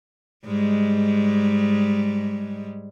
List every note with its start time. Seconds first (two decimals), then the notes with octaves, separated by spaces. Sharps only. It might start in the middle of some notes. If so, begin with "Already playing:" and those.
0.45 G#2 G3 G#3